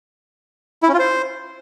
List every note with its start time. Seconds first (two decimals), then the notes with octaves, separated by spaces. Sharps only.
0.83 E4
0.88 C#4
0.94 F4
0.99 C5